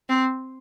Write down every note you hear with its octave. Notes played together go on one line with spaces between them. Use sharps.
C4